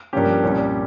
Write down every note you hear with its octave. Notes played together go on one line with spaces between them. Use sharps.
G2 F3 A#3 C#4 G4
C2 A#2 G3 C#4 G4